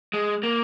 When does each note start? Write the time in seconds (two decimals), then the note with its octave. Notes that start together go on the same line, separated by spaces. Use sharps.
0.14 G#3
0.43 A#3